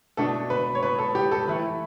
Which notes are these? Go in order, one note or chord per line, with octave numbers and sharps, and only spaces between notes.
B2 A3 D4 A4
B4
C#5
B4
A4
G4
A4
E3 A3 E4 B4